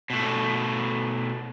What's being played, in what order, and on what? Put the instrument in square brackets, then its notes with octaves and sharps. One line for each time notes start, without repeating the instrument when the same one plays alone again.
[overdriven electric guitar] B2 A3